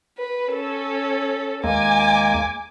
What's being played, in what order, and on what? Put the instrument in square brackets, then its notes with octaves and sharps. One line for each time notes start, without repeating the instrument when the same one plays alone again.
[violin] B4
C#4 A4
[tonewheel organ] D#2 G#3 A#3 [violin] G#5 D6